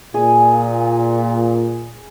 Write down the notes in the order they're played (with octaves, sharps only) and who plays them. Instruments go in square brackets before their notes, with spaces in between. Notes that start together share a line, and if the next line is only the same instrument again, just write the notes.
[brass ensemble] A#2 [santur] G#4